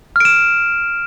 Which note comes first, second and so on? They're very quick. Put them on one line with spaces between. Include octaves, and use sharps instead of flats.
F6 D7 E7